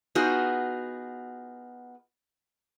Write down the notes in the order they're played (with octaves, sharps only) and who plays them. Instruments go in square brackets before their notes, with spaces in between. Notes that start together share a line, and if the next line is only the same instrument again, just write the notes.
[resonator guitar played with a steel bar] B3 D#4 F4 F#4 G#4